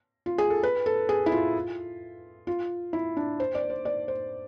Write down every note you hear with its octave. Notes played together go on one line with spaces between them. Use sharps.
F4
G#4
A4
B4
A4
G#4
E4
F4
F4
E4
D4
C5
D5
C5
D5
C5